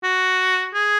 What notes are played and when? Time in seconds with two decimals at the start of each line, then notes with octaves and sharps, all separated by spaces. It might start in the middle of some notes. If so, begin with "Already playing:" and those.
0.04 F#4
0.74 G#4